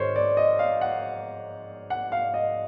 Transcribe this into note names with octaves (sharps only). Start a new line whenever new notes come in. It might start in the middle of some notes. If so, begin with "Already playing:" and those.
Already playing: G#2 D#3 G#3 A#4 C5 C#5
D5
D#5
F5
F#5
F#5
F5
D#5